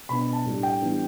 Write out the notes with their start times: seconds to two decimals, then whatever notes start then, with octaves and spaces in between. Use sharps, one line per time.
0.09 B2 B3 D4 B5
0.21 B5
0.33 A5
0.46 A2 G3 D4
0.63 G5
0.81 E3 G3 B3 D4